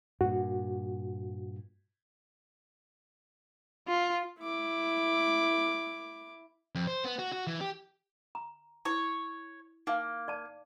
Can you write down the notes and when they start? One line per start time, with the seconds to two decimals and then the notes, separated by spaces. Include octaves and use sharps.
0.21 G2 A#2 F#4
3.88 F4
4.39 E4 D6
6.75 F2
6.87 C5
7.04 B3
7.19 F#4
7.32 F#4
7.47 E3
7.61 G4
8.35 A#5
8.85 E4 C#5
9.87 A#3 D#4 F5
10.28 D5 A5